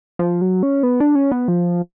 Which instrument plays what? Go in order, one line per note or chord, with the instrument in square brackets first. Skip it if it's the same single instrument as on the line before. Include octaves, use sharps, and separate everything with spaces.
[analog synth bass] F3
F#3
C#4
B3
D4
C#4
B3
F3